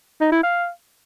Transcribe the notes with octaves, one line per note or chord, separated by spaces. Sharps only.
D#4
E4
F5